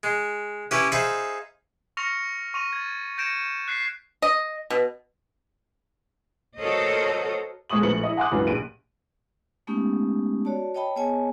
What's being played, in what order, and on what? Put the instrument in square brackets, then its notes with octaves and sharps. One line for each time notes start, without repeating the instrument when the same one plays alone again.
[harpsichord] G#3
C#4 E4 G4 B4
D#4 G#4 C5 E5 F5 B5
[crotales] C#6 F6 A#6 C#7 F7
C#6 D#7 F7
G#6 A6
G6 G#6 A#6 C#7 D7 E7
F#6 B6 C7
[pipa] D#5
B2
[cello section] F#4 A4 A#4 C5 C#5 D#5
[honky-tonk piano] B1 G#3 C#6 D#6 F#7
A#1 A2 F3 B4 C#7 F#7
E4 D#5
F#5 G#5 C6 D6 D#6 F#6
C#2 G2 E3 F#3 F4
A#1 D7 D#7
[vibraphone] G#3 A3 B3 C#4 D#4 G4
F#4 C#5 D5 A5
C#5 D#5 G5 A5 B5
B3 G#4 C#5 D#5 G#5 A5